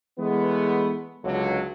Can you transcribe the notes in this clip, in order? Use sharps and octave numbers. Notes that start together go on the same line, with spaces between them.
E3 G#3 A3 B3
C#2 D3 F#3